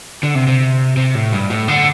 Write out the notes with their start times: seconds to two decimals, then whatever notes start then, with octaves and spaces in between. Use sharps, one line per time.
0.23 D3
0.35 C3
0.48 C3
0.97 C3
1.15 A2
1.32 G2
1.50 A2
1.68 D3